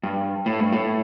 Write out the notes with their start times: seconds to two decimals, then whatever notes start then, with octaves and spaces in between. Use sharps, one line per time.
0.03 G2
0.46 A2
0.60 G2
0.73 A2